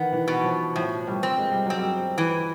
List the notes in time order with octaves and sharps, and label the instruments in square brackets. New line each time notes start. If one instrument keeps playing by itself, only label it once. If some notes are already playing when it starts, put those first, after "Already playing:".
Already playing: [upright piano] D#3 E3 [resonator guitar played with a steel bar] B3
[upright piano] E3
[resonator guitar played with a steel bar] B2
[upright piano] F3
[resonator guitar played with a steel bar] A2 [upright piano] F3
[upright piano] G3
[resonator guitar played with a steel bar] C4
[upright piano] G#3
G3
[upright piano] F#3 [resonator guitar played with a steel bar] C4
[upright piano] G3
[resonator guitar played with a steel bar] E3